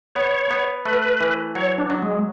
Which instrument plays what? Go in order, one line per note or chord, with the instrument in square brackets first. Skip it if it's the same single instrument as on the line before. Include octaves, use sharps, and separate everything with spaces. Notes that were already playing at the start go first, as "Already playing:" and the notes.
[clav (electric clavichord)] B3 [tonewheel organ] C#5
[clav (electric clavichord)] B3
[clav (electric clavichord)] A3 [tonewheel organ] B4
[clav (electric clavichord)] E3
[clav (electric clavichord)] F#3 [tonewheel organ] C#5
[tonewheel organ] D4
[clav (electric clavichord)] F#3
[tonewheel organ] G#3